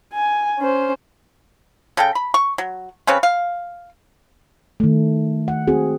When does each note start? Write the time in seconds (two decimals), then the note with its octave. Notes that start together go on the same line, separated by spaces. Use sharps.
0.13 G#5
0.59 C#4 C5
1.97 C#3 A4 G5
2.15 B5
2.34 C#6
2.58 F#3
3.07 C#3 C4 C#4 B4
3.23 F5
4.80 D#3 A3
5.48 F#5
5.67 C4 F#4 G#4